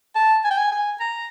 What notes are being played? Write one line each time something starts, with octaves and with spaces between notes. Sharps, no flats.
A5
G#5
G5
G#5
G#5
A#5